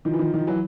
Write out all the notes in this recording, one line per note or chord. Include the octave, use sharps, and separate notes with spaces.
D#3 F3
E3
D#3 F3
D#3 F3
E3 F#3